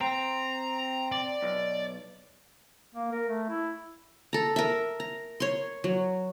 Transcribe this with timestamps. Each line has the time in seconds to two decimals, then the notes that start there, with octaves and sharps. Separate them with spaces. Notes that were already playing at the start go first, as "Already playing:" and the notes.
0.01 C4 A#5
1.12 D5
1.42 B1
2.95 A#3
3.12 A#4
3.28 A3
3.49 E4
4.33 A4 A#5
4.56 A#4 E5
5.00 A#5
5.40 C#5 C6
5.84 F#3